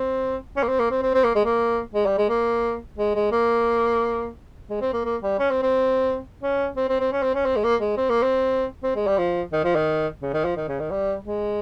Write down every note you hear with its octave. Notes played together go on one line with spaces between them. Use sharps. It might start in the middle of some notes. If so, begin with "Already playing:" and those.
Already playing: C4
C#4
A#3
C4
A#3
C4
C4
C4
A#3
G#3
A#3
G#3
G3
G#3
A#3
G#3
G#3
A#3
G#3
C4
A#3
A#3
G3
C#4
C4
C4
C#4
C4
C4
C4
C#4
C4
C#4
C4
G#3
A#3
G#3
C4
A#3
C4
C4
G#3
G3
F3
D#3
F3
D#3
C#3
D#3
F3
D#3
C#3
D#3
G3
G#3